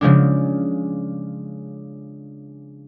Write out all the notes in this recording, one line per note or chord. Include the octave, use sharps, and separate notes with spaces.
C#3 F3 G#3 D4